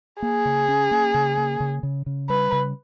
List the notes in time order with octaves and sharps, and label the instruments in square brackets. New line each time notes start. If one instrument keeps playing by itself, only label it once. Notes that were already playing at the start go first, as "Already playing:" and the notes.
[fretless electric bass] A#3 [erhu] G#4
[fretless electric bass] C#3
C#4
A#3
C#3
A#3
C#3
C#3
C#3
[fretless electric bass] G3 [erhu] B4
[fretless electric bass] C#3